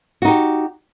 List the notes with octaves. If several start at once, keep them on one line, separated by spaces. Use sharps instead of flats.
D#4 F#4 G4